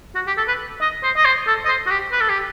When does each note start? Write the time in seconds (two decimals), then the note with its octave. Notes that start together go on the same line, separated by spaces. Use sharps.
0.15 F#4
0.27 G4
0.37 A4
0.48 B4
0.81 D#5
1.03 C5
1.17 D#5
1.25 C5
1.47 A4
1.65 D#5
1.68 C5
1.86 F#4
1.91 G4
2.12 B4
2.21 A4
2.29 G4